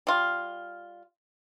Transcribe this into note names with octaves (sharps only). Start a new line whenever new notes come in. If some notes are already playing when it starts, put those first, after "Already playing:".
G3 F4